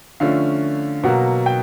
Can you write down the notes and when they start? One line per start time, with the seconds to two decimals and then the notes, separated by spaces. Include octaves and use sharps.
0.20 D3 F3 A3 C#4 F5
1.04 B2 F#3 A#3 F#5
1.46 G5